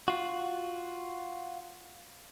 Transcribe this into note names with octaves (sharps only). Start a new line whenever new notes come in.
F4 F#4